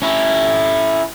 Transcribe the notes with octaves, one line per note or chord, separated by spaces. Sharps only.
C#4 E4